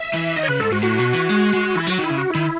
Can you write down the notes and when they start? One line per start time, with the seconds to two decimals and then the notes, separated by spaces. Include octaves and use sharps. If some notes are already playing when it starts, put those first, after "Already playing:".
Already playing: E5
0.14 E3
0.36 D#3 D#5
0.43 C#5
0.48 C#3 B4
0.60 G#2 A4
0.72 G#2 F#4
0.83 A2 F#4
0.99 B2
1.13 E3
1.29 G#3
1.53 G#3
1.75 E3 E4
1.87 F#3 F#4
1.98 D#3
2.04 E4
2.10 C#3
2.18 F#4
2.30 D#3 E4